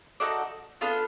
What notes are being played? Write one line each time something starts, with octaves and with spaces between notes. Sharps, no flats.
D#4 F#4 A4 D5
B3 D4 F4 A4